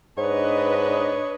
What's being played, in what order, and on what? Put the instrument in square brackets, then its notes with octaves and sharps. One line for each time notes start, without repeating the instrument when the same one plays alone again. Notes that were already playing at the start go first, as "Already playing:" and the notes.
[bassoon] G#2 [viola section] D4 B4 D#5 [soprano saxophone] C#5